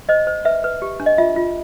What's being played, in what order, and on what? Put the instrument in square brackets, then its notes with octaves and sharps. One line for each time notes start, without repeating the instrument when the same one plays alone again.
[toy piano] C5 D#5
C5
B4 E5
B4
G4
D4
D#5
F4 E5
F4